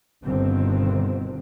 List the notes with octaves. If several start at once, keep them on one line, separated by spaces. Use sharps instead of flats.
G1 G2 B2 D3 D#3 C4